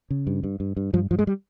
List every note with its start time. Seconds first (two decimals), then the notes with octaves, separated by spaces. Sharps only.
0.10 C#3
0.27 G2
0.44 G2
0.60 G2
0.77 G2
0.93 G2 F3
1.11 G2 F3
1.19 G#3
1.27 G3